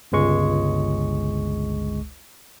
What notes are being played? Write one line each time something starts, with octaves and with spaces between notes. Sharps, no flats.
G1 C#2 G#3 C#6